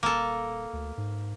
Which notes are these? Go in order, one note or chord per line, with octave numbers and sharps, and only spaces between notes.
D#1 A#3 A4
D2
G#2